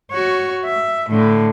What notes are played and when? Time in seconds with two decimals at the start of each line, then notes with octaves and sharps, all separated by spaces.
0.12 F#4 C#5
0.65 E5
1.10 A2 D3